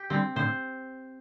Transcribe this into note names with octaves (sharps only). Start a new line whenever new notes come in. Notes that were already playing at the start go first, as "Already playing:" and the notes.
Already playing: G4
D3 G3 C4
A2 D3 C5